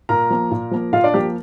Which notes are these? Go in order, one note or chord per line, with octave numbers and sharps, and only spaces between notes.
A#2 A#4 A#5
F3 A#3
A#2
F3 A#3
A#2 F4 F5
D4 D5
F3 A#3 G4